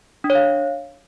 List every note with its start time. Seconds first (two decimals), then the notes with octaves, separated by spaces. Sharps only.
0.24 D4
0.30 C#5
0.35 F5